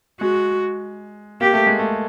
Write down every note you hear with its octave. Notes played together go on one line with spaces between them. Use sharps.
G#3 F#4
A#3 G4
A3
G#3
A3